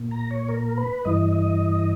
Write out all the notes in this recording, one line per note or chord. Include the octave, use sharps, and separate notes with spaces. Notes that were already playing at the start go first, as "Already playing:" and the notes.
Already playing: A#2
A#5
C#5
A#4
B4
G2 E3 D#5
D#5